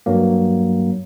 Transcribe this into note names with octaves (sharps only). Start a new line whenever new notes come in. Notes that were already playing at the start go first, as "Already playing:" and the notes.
G2 F#3 A#3